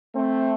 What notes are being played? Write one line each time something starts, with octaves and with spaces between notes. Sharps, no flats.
A3 C4